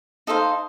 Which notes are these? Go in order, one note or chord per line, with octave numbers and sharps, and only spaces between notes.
D#4 A4 C5 F5